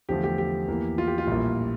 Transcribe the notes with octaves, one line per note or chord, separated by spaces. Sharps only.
E2 D3 F3 A3 G4
G4
G4
E2 E3 A#3
F4
G4
F4
A#1 A2 G3 A#3